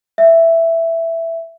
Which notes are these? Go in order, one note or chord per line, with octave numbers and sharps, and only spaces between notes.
E5